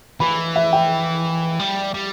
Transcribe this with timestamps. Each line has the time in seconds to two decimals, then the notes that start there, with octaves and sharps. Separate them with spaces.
0.20 E3 B5
0.56 E5
0.73 G5
1.59 G3
1.94 G3